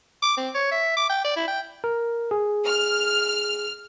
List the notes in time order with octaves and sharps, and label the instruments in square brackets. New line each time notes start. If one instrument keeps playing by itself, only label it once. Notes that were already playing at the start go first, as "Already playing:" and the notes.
[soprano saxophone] D6
C4
C#5
E5
D6
G5
D5
E4
G5
[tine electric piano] A#4
G#4
[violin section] F6